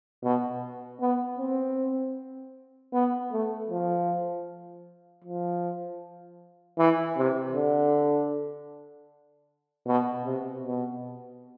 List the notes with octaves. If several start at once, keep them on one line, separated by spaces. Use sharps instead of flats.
B2
B3
C4
B3
A3
F3
F3
E3
C3
D3
B2
C3
B2